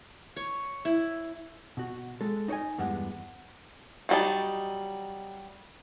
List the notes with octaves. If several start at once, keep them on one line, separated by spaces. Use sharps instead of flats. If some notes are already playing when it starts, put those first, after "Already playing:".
C#5
E4
B2 F#4
G#3 A4
D#4 C5 C#5 D#5 G#5
E2 G2 G3 G#3 B3 F#5
E3 F#3 G3 D#4 A5